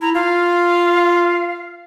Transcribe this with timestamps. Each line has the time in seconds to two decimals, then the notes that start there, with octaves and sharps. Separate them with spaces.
0.02 E4 A#5
0.15 F4 F5